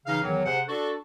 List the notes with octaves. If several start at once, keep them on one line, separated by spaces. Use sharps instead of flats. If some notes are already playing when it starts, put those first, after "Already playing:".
C#3 E3 D#4 F5
E2 D#3 E3 F#3
C3 G#4 C5 F#5
D4 F#4 A4